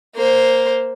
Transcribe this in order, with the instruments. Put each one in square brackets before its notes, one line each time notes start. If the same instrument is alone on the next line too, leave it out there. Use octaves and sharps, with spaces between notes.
[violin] A#3 C5